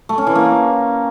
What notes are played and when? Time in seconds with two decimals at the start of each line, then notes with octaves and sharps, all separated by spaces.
0.09 A3
0.18 C#4
0.27 E3
0.35 A#3